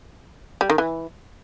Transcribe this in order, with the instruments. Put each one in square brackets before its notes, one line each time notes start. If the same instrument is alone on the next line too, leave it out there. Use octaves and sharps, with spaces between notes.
[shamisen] G3
D#3
E3